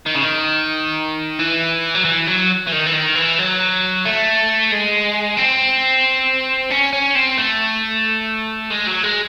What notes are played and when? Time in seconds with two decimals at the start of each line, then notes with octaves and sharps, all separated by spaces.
0.06 D#3
0.15 C#3
0.23 D#3
1.39 E3
1.95 F#3
2.05 E3
2.27 F#3
2.67 E3
2.72 D#3
2.86 E3
2.93 D#3
3.15 E3
3.39 F#3
4.05 A3
4.72 G#3
5.37 C4
6.70 C#4
6.93 C#4
7.15 C4
7.37 A3
8.71 G#3
8.87 F#3
9.04 G#3